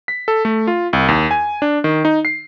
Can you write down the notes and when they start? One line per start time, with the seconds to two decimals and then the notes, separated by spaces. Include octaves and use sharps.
0.08 B6
0.28 A4
0.45 A3
0.67 F4
0.93 C2
1.08 D#2
1.31 G#5
1.62 D4
1.84 D#3
2.05 D#4
2.25 C7